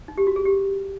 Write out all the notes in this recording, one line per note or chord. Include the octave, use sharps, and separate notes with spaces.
D#4
G4
F#4
G#4
G4